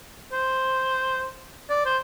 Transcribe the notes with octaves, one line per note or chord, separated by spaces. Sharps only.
C5
D5
C5